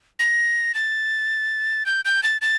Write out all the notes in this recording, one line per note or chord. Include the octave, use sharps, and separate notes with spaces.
A#6
A6
G6
G6
A6
A6